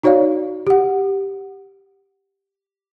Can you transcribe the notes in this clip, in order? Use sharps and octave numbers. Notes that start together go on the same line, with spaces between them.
D#4 F#4 C#5 D5 F5
G4 F#5